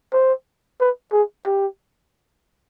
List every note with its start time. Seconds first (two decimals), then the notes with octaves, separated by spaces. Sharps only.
0.13 C5
0.80 B4
1.12 G#4
1.46 G4